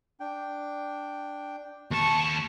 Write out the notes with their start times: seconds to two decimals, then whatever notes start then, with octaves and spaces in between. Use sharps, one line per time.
0.20 D4 G5
1.91 D#2 A5 C#6